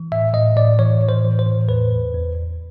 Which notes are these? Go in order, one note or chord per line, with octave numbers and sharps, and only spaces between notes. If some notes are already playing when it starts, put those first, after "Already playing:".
Already playing: E3
A2 E5
A2 D#5
A2 D5
E3 C#5
A2
C5
E3
C5
A2
E2 B4
E2
E2
E2